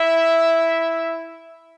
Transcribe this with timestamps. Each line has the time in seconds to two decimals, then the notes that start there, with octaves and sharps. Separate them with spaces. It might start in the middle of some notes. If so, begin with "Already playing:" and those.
Already playing: E4 E5